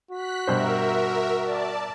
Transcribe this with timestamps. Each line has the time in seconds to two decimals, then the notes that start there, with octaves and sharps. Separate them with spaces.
0.11 F#4 F#6 B6
0.47 G2 B2 A#4 C5 E5
1.42 D5 A5